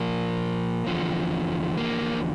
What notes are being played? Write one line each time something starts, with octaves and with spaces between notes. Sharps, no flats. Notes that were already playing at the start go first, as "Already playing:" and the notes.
Already playing: A#2 F3 A#3
E2 D3 F3
A#3